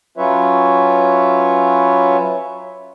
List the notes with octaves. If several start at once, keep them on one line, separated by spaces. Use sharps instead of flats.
F#3 C#4 F4 B4 C#5 E5